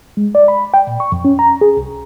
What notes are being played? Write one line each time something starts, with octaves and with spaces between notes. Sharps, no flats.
G#3
D5
B5
G5
A#2
C#6
F2
C#4
A#5
G#4
C2